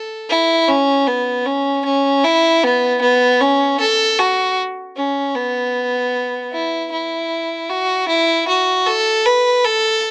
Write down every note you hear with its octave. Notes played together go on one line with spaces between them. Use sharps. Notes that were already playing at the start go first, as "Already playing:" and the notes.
Already playing: A4
E4
C#4
B3
C#4
C#4
E4
B3
B3
C#4
A4
F#4
C#4
B3
E4
E4
F#4
E4
F#4
A4
B4
A4